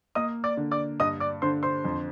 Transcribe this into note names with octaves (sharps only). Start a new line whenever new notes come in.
A#3 D#5 D#6
D5 D6
D3
D5 D6
G2 D#5 D#6
D5 D6
D3 C5 C6
C5 C6
F2